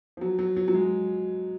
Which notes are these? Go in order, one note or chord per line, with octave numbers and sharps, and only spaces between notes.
F3
F#3
F#3
F#3
F#3
G#3